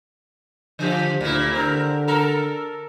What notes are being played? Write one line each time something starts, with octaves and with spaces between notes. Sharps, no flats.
D3 F3 G4
D2 A#2 E4
D3 C4 A#4
A4 A#4